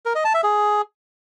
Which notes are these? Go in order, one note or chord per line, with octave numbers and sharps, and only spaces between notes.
A#4
D#5
A5
E5
G#4